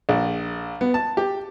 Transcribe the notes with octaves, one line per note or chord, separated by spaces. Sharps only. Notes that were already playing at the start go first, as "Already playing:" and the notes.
A#1
B3
A5
G4